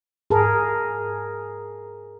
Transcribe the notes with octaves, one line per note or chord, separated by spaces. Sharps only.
G#2 G#4 A#4 A5